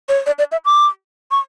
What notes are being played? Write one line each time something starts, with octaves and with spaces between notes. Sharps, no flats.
C#5
D5
D5
E5
D6
C#6